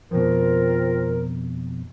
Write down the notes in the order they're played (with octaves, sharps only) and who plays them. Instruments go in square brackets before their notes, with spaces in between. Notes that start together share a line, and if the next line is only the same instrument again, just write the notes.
[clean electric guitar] F2 B2 [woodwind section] C4 F4 A#4